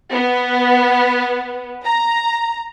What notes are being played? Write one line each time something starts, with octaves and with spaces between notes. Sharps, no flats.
B3
A#5